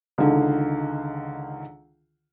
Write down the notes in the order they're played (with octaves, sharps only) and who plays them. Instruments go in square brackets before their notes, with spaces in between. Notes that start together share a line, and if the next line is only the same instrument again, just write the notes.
[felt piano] C#2 D3 D#3